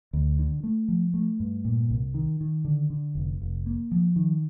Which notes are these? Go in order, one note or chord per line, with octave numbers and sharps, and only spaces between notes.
D2
D3
A3
F3
A3
G2
A#2
C2
D#3
D#3
D3
D3
F1
F1
A#3
F3
D#3